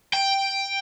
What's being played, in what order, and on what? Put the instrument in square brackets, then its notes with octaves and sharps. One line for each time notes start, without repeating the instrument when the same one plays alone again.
[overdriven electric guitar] G5